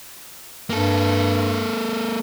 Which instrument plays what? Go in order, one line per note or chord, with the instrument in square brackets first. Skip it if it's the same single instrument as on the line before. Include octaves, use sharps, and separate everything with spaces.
[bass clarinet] G2 [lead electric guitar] A#3 A4